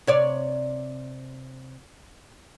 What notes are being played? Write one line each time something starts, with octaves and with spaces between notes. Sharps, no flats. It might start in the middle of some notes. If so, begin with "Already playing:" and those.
C3 C#5 D5